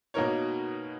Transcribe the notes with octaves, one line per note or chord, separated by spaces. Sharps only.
B2 A#3 D#4 A#4 C#5